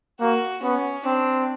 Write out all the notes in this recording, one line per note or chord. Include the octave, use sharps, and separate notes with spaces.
A#3 F#4
B3 C#4
C4 D4